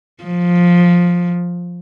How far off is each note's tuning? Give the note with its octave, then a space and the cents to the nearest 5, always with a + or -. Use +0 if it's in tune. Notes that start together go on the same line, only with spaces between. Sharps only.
F3 +10